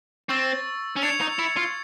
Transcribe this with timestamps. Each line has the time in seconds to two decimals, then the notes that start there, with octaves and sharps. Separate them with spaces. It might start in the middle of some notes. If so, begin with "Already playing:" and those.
0.29 C4 C#6 E6 A6
0.96 C#4
1.02 D4 G#6 C#7 F7
1.21 D#4
1.39 E4
1.57 F4